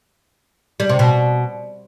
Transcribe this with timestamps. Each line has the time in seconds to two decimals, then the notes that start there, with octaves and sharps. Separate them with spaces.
0.80 G3
0.89 C3
0.99 B2